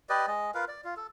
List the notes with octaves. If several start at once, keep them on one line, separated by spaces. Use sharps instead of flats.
G4 B4 D5 D#5
G#3 D#5
F4 A#4 B4 F5
D5
F4
A4